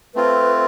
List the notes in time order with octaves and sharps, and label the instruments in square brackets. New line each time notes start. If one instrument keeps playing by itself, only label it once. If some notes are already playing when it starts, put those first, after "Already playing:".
[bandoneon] A3 C4 F4 [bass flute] B4